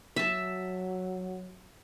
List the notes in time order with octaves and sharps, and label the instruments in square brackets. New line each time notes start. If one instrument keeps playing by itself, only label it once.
[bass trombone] F#3 [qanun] E5 A5